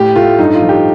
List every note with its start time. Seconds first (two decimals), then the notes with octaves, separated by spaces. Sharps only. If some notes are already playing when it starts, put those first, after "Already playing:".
Already playing: A2 G4
0.16 A3 F4
0.39 G2 D#4
0.54 F4
0.62 F3
0.69 G4